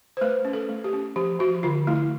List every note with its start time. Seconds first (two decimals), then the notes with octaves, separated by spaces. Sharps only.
0.17 C5
0.21 A3 B4
0.45 C#4
0.53 A4
0.69 A3
0.84 G4
0.93 C#4
1.16 F3 G4
1.40 F3 F#4
1.63 D3 F4
1.87 A3 E4